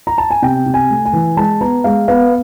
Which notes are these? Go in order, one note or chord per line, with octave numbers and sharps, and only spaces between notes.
A#5
A5
G#5
C3 G5
C3
G#5
A3
G#5
E3
G#3 A5
B3 A#5
G#3 F5
B3 F5